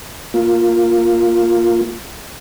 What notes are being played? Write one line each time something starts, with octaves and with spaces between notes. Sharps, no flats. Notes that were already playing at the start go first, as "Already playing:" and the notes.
A#3 F4